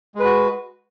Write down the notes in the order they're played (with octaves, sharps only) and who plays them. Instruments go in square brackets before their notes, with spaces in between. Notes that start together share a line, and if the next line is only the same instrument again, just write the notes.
[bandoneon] G#3
B4
F#4